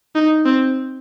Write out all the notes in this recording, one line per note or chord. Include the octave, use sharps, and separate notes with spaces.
D#4
C4